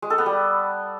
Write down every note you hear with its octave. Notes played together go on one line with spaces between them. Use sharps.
G#3
A4
B3
G3